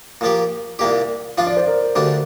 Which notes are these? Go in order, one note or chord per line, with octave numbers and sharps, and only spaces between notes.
A#2 F3 A#3 G4
C2 A#2 A#3 G4 D5
F3 D4 F4 F5
D5
C5
A#4
D2 D3 G3 D4